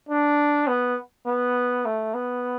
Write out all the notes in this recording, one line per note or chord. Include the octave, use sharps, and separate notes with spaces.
D4
B3
B3
A3
B3